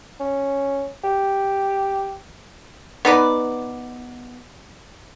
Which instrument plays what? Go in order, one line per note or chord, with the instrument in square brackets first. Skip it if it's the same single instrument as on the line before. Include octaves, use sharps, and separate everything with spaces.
[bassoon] C#4
G4
[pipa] B3 D#4 B4 D5